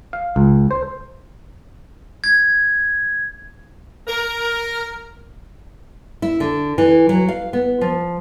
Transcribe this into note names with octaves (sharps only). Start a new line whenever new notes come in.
F5
C#2
C5
G#6
A#4
E4
D3
E3
F#3
F5
B3
F3